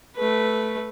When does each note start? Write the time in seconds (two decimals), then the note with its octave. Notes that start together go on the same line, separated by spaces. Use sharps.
0.17 A3 B4